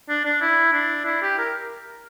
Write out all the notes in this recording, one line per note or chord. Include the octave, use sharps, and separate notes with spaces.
D4
D4
E4
D4
E4
G4
A#4